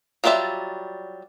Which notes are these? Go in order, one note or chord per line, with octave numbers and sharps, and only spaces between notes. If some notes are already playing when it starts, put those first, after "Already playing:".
F#3 G3 F4 D5 E5